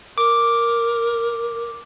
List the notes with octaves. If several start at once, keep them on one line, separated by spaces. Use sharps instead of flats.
A#4 D6